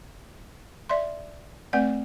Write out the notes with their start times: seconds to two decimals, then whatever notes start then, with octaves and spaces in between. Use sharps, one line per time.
0.89 D5 E5 C6
1.73 A3 C4 B4 D5 F#5